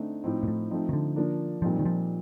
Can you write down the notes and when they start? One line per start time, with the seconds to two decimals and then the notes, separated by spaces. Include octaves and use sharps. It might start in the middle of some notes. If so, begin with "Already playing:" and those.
Already playing: D3 A3 C4 D#4
0.24 A2 F3 C4 D#4
0.43 A#2
0.48 A2
0.71 F3 A3 C4 D#4
0.89 D#3
0.93 D3
1.16 F3 A#3 D4
1.62 A#2 F3 G3 C4 D#4
1.79 D#3
1.85 F3